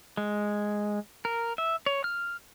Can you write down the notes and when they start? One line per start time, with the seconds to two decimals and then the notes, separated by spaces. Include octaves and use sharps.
0.17 G#3
1.25 A#4
1.58 E5
1.86 C#5
2.04 F6